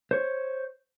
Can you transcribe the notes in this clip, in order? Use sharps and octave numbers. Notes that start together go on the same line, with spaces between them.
C5 C#5